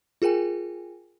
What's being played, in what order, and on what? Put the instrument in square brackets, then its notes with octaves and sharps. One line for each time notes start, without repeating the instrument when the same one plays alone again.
[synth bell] F4 G#4 A#4 G5 G#5